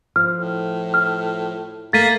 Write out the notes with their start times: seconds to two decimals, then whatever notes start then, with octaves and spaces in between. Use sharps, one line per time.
0.16 F3 F6
0.35 A2
0.94 F6
1.93 A3 A#3 A6 B6 D#7